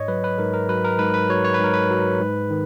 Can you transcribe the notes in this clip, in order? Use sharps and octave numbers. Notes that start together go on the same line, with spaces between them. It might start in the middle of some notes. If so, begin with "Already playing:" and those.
Already playing: G#2 C#5 D#5
F#3 B4
B4
G#2 A#4
A#4
F#3 B4
A#4
G#2 B4
B4
F#3 C#5
C#5
B4
G#2 A#4
B4
F#3
G#2
D#3